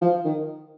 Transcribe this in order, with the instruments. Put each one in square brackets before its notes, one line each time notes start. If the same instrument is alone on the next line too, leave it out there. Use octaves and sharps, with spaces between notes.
[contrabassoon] F3
D#3